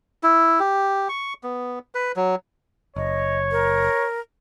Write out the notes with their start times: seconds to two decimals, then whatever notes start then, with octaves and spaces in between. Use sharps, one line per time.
0.23 E4
0.60 G4
1.09 C#6
1.43 B3
1.95 B4
2.16 F#3
2.96 F#1 C#5 D#5
3.51 A#4